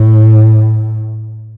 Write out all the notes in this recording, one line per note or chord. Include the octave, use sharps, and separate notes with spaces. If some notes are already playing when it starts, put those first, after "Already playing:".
Already playing: A2